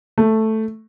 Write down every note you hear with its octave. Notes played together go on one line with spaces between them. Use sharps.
A3